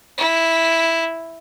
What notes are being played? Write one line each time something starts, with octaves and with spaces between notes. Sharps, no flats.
E4